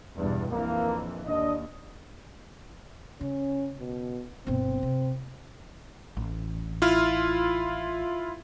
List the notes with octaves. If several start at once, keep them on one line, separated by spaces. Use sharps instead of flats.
E2 G2 B2
A#1 F2 E3 A#3
D#2 D4 D#5
C#3 C#4
B2
G1 B2 C4
C3
A1
E4 F4 F6